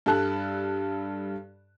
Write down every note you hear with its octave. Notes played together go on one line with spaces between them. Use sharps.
G2 G3 A4 A5 F#6